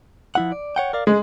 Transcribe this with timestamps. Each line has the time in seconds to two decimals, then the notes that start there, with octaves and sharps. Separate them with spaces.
0.35 F3 E4 F#5
0.52 D5
0.76 C#5 F#5 G5
0.93 A#4 D5 F5
1.07 G#3 G#4